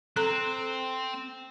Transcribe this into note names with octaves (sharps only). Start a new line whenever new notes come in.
C4 A4 A#5